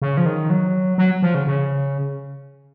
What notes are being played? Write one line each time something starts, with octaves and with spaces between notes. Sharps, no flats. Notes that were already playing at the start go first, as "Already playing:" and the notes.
C#3
F3
D#3
F#3
F#3
F3
C#3
C#3